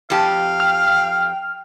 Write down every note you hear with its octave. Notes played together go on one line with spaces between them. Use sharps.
F2 G4 F5 A5
G5 F6